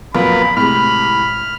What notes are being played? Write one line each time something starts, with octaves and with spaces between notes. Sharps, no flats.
A#1 F#2 A#3 B3 F4 B5
A2 C3 G#3 B5 F6